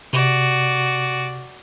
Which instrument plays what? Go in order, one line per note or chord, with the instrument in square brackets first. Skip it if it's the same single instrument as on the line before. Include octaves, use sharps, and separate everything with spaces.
[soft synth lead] C3 [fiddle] F#4 D5